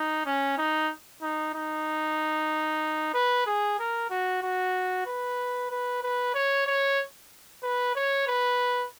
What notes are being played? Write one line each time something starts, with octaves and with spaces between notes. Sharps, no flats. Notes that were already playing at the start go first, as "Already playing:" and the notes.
Already playing: D#4
C#4
D#4
D#4
D#4
B4
G#4
A#4
F#4
F#4
B4
B4
B4
C#5
C#5
B4
C#5
B4